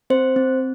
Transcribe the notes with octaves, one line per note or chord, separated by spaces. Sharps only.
C4 C5
C4